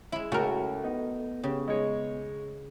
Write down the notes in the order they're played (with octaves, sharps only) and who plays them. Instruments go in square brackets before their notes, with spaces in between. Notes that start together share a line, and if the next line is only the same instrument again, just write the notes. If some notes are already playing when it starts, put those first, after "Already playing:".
[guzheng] G#3 E4
[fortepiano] C#2 [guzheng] A3 [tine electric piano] C#4 [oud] F#4 A#4
[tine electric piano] B3 [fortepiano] D#4
[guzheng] C#3 [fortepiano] G4
[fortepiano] G#3 D#4 C#5